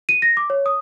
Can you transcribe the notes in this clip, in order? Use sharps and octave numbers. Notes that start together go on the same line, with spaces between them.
D#7
A#6
D6
C#5
D#6